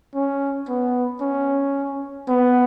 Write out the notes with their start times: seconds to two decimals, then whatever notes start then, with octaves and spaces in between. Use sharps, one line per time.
0.15 C#4
0.68 B3
1.21 C#4
2.28 B3